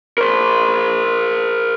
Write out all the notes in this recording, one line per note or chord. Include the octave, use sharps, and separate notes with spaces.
A#4 C5